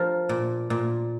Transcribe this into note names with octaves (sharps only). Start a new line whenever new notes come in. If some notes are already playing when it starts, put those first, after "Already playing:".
Already playing: F3 A#4
A#2
A#2